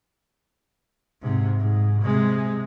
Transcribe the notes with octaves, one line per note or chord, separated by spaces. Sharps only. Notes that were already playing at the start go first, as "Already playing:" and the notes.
G#2 C3
G#2
C3 G#3